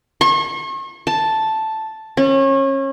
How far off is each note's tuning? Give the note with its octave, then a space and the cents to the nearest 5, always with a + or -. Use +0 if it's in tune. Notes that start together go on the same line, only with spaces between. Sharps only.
C#6 -40
A5 +0
C#4 -30